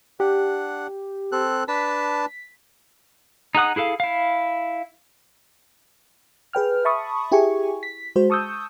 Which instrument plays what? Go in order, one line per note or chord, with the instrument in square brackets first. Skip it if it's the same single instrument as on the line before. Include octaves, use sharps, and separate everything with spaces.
[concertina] D4 F#5 [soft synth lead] G4
[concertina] C4 A4 F#6
[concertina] D4 B4 A5 [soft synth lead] B6
[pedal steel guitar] D#4 G#4 F#5 D#6
E4 G#4 A4 F5
E4 F5
[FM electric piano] G#4 B4 G5 F6
E5 A5 B5 C#6 D#6
E4 G4 G#4 G#5 C#6
B6
G#3 F#4 C5
A5 C#6 D#6 E6 G6